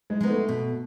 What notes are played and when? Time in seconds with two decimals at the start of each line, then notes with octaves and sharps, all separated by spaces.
0.10 G#3
0.21 G#3 B3 D#4
0.30 A3
0.49 B2